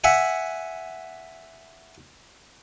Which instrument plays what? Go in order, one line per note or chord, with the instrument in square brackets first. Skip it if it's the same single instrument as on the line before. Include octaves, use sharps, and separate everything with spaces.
[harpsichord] E5 F#5 G#5